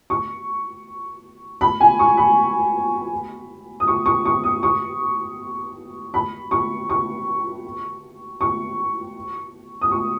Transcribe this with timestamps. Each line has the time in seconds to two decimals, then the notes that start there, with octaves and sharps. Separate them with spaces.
0.10 C#6
1.61 B5
1.80 G#5
1.99 C#6
2.17 B5
3.80 D#6
3.88 C#6
4.06 C#6
4.25 C#6
4.44 D#6
4.63 C#6
6.14 B5
6.51 C#6
6.90 C#6
8.41 C#6
9.81 D#6
9.92 C#6